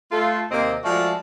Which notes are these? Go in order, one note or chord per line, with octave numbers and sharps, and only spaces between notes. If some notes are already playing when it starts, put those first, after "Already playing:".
A3 F4 A4
D#2 C3 A#3 C4 G4 D#5
F3 G#3 A3 F#4 D5 E5